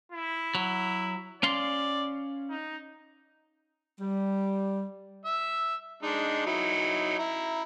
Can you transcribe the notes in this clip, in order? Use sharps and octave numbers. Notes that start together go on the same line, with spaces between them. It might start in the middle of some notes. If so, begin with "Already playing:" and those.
E4
F#3
C#4 D5 F5 C6
D#4
G3
E5 E6
G#3 D4 D#4
F#3 D#4 E4
E4 A#5